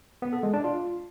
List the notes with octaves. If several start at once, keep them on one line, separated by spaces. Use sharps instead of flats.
B3
A4
G#3
D4
F4